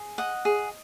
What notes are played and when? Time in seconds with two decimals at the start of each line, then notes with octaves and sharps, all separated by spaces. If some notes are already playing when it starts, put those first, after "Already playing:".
Already playing: G#4
0.18 D#5 F#5
0.45 G#4